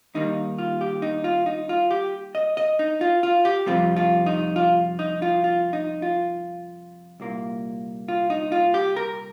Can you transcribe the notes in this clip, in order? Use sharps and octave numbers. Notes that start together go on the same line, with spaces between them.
D#2 D#3 G3 A#3 D#4
F4
G4
D#4
F4
D#4
F4
G4
D#5
D#5
D#4
F4
F4
G4
F2 C3 G3 C4 F4
F4
D#4
F4
D#4
F4
F4
D#4
F4
C2 A#2 A#3
F4
D#4
F4
G4
A#4